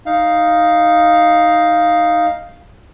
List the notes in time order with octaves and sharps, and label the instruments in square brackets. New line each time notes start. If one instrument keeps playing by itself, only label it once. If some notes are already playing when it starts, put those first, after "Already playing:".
[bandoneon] D#4 F5